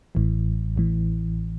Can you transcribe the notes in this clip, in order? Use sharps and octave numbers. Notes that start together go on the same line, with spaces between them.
A1 A2 E3
A1 A2 E3